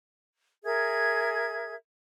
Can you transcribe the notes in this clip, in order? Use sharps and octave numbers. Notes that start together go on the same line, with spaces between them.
G#4 A#4 E5 G#6